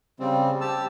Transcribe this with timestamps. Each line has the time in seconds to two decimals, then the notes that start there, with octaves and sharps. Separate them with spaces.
0.20 C#3 G3 C4
0.61 G4 A5 E6